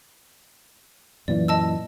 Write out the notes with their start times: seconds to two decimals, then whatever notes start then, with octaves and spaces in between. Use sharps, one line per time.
1.28 F#2 A#2 E3 D5
1.48 D#5 A5 E6